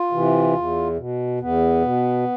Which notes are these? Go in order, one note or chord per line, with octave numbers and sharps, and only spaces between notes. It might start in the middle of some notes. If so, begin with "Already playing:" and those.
Already playing: F4
C3 E3
E2
B2
E2 B3
B2